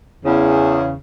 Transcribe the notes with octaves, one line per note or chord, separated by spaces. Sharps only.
E2 C#3